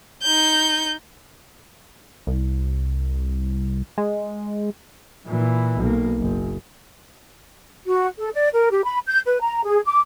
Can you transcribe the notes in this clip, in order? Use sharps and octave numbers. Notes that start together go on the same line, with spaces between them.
D#4 G6
C2
G#3
A#2 E3
B1 A#3
F#1
F#4
A4
D5
A#4
G4
B5
G6
B4
A#5
G#4
D6